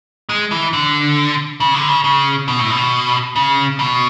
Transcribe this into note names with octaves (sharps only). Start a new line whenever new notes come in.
G#3
E3
D3
C#3
D3
C#3
C#3
B2
A2
B2
C#3
B2